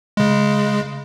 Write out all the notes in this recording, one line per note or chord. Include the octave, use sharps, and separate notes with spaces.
C#3 G#3